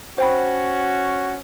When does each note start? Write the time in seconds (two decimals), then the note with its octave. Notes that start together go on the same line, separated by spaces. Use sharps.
0.18 C#4 F#4 C5 G5 B5